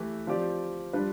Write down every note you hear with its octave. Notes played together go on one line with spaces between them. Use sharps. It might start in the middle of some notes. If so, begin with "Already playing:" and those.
Already playing: E3 A3 E4 G4 B4
F3 C4 G4 D5
G3 D4 F4 B4